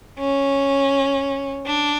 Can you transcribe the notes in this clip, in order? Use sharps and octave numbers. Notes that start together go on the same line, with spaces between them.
C#4
D4